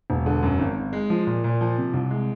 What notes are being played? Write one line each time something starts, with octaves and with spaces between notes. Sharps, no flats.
E1
D3
F#2
G#1
G#1
G#3
F3
A#2
A#2
F3
C3
C2
G#3